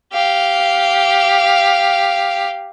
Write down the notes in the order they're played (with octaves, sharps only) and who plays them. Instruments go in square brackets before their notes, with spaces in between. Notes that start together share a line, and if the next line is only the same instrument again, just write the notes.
[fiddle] G4 F5